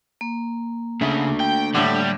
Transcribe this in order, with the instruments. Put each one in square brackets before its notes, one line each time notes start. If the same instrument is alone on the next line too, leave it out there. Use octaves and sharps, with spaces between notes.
[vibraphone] A#3
[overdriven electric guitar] C#3 [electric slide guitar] A3 D4 E5
[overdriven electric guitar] G5
[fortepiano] A2 D3 [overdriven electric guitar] G3